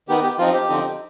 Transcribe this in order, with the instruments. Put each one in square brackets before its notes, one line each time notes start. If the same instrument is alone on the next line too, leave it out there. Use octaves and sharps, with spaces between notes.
[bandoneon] D#3 B3 D#4 G4
G4
F3 C4 D#4 F4
G4
D3 F3 C4 D#4